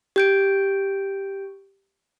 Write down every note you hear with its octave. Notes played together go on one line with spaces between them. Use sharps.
G4 G6 D7